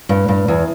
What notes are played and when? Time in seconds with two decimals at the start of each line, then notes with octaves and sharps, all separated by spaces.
0.09 G2
0.28 G2
0.48 E2